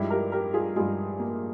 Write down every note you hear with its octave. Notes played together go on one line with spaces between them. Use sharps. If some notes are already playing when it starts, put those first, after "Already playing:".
Already playing: G2 F3 G#3 E4 G4
G4 A#4
G4 A#4
F4 G#4
G2 F3 G#3 F4 G#4
A#3